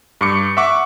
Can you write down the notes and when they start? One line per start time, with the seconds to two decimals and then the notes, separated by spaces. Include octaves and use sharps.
0.21 G2 C#6 D6 C#7
0.57 E5 F#5 C#6 D6